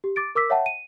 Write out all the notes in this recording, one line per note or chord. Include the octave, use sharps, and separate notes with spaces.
G4
D6 A6 D7
A#4 D6 E6 B6
C#5 E5 F#5 G5 A5
D#7